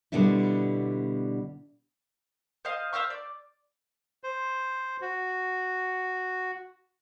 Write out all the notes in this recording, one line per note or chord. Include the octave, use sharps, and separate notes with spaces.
B2 D3 G3 B3 D4 E4
C5 D#5 F5
C5 E5 F5 C#6
D5
C5
F#4